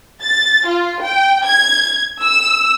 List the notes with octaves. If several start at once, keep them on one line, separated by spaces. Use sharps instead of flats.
A6
F4
G5
G#6
E6